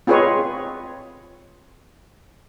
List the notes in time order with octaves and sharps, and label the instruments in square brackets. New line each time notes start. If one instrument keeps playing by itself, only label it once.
[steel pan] C4 F4 G#4 B4 C#5 D#5